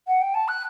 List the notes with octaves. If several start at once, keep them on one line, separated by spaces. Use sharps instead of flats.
F#5
G5
A5
F#6